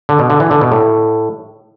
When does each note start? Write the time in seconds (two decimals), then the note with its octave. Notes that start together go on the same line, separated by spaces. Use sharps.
0.09 D3
0.19 B2
0.30 D3
0.40 E3
0.51 D3
0.61 B2
0.72 A2